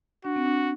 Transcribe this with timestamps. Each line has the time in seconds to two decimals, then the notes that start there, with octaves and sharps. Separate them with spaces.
0.25 D4 F#4
0.36 C4
0.45 D4